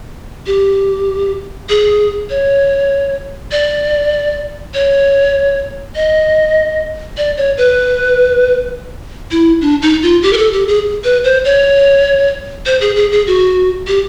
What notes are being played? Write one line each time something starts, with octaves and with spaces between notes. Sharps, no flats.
G4
G#4
C#5
D5
C#5
D#5
D5
C#5
B4
E4
D4
D#4
F4
G4
A#4
A4
G4
G#4
B4
C5
C#5
C5
G#4
G#4
G#4
F#4
G4